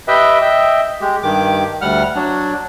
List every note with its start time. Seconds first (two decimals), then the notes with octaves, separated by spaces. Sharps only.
0.08 G4 B4 D#5 E5 G5
0.41 D#5 E5 G5
1.01 G#3 G4
1.23 G2 D#3 G4 D6
1.81 D2 G3 F#5 F6
2.16 F#3 D4